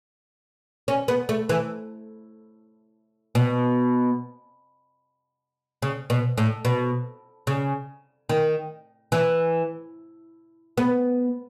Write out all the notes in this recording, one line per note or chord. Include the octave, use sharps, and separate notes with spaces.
C#4
B3
A3
E3
B2
C#3
B2
A2
B2
C#3
D#3
E3
B3